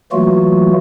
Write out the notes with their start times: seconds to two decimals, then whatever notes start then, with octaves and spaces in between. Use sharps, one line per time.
0.12 E3 F#3 A3 A#3 F4 F#4